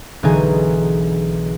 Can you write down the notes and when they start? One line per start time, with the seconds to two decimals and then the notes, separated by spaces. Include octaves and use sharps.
0.23 B1 D3 E3 D#4 G#4 G#5